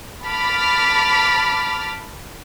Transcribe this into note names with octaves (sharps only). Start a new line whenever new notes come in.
A5 B5 D6 F6 A6 B6